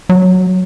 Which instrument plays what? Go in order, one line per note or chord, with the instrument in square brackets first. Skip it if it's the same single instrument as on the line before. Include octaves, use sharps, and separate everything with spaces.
[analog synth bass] F#3